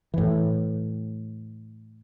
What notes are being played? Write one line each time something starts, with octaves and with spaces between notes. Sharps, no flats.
A2 E3